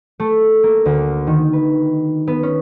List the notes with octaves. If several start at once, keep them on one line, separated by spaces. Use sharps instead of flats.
A3
A#3
D2
D#3
B4
B3
C#4